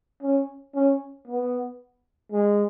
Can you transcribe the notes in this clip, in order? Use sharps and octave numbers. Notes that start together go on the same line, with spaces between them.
C#4
C#4
B3
G#3